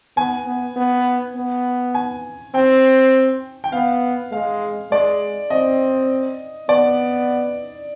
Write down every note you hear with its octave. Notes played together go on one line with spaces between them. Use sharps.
B3 G#5
B3
B3
B3
G#5
C4 G5
G5
B3 F5
G#3 F5
G#3 D5
C4 D#5
B3 D5